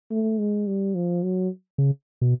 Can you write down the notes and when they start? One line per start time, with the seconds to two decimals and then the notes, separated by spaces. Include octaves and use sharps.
0.11 A3
0.39 G#3
0.67 G3
0.95 F3
1.23 F#3
1.78 C#3
2.21 B2